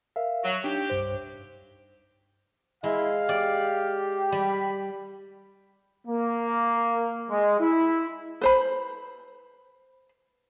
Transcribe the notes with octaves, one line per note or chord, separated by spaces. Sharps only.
A#4 E5 F5
F#3
D4 D#4 G4
C2 G2 C5
G#3 E4 F5
G4 D5
G3 B5
A#3
G#3
E4
B4 C5 B5